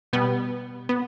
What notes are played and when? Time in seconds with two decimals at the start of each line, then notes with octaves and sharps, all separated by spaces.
0.13 B2 G3 B3
0.89 B3